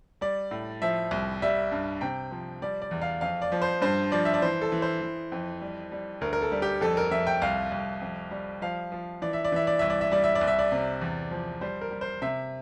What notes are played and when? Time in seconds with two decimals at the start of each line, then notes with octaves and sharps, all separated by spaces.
0.21 G3 D5
0.51 A2
0.82 F3 E5
1.11 C2
1.42 G3 E5
1.72 G2
2.01 C3 G5
2.31 F3
2.62 G3 D5
2.82 D5
2.91 E2
3.02 F5
3.21 F2 F5
3.42 D5
3.52 F3
3.62 C5
3.82 G2 C5
4.12 F3 D5
4.25 E5
4.34 D5
4.42 E3 C5
4.61 A4
4.72 E3
4.82 C5
5.01 E3
5.32 F2
5.61 G3
5.92 G3
6.21 D2 A#4
6.33 A#4
6.42 A4
6.52 G3
6.62 G4
6.81 F2 A4
6.97 A#4
7.11 F2 E5
7.27 G5
7.42 C2 F5
7.72 C2
8.01 F2
8.31 G3
8.62 F3 F5
8.92 F3
9.22 E3 D5
9.33 E5
9.45 D5
9.52 E3 E5
9.67 D5
9.79 C2 E5
9.90 D5
10.01 E5
10.12 G3 D5
10.24 E5
10.35 D5
10.41 C2
10.48 E5
10.59 D5
10.72 C3
11.01 E2
11.31 F3
11.61 G3 C5
11.81 A#4
11.91 G3
12.01 C5
12.22 C3 E5